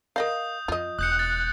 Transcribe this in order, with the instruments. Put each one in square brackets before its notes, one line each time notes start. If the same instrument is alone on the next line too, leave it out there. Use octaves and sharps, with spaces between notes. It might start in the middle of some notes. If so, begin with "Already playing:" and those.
[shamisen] A#4 D#5 F5 [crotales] D#6 G6
[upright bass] F2 [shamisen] F4 D#5
[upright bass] E1 [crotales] D#6 G6 C#7 [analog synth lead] F#6
[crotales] A6